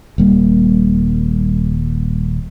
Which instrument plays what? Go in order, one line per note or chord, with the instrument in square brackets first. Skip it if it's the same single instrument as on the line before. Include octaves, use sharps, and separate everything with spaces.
[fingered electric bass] D#1 G3 A#3